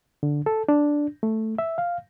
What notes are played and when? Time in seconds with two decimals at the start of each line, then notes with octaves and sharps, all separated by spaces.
0.23 D3
0.46 A4
0.69 D4
1.23 A3
1.58 E5
1.78 F5